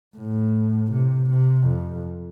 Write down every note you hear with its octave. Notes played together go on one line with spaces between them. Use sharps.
A2
C3
C3
F2